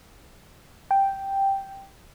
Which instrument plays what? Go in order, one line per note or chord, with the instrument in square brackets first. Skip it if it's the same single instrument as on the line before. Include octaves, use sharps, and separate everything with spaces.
[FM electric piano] G5